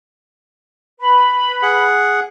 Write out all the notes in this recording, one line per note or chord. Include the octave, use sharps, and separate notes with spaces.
B4 B5
G#4 F#5